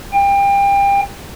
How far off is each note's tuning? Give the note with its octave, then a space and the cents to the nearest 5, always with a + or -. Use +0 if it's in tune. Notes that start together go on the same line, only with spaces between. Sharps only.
G5 +30